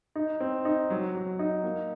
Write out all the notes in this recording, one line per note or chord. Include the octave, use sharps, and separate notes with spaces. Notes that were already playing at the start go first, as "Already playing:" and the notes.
D#4
C4
D#4
F#3
F#3
D#4
A#3